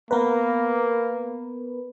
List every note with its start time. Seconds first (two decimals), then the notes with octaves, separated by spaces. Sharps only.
0.11 A#3 B3 A#4 B4